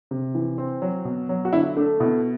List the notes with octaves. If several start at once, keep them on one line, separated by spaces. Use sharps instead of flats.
C3
E3
C4
F#3
B2
F#3
F#4
D3 E4
A3 D4
B2 E4